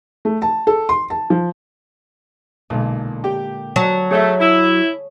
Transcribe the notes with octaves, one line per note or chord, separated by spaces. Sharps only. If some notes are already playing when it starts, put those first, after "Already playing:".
A3
A5
A4
C6
A5
F3
B1 A#2 D3 G#3
G4 G5
F#3 A5
A3 G#4 C#5 E5
E4